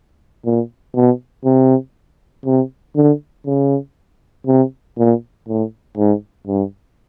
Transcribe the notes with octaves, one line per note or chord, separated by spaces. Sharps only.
A#2
B2
C3
C3
D3
C#3
C3
A#2
A2
G#2
G2